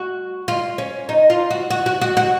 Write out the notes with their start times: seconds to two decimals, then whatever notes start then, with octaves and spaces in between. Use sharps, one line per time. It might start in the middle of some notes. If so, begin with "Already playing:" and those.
Already playing: F#4
0.48 F4
0.78 C#4
1.09 D#4
1.30 F4
1.50 F#4
1.70 F#4
1.86 F#4
2.01 F#4
2.17 F#4